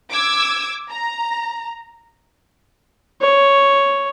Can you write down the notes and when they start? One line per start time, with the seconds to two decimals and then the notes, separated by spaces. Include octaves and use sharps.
0.10 D6 E6 G#6
0.90 A#5
3.21 C#5